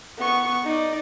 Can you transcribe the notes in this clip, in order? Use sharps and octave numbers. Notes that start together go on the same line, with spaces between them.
B3 C#6
D#4 D5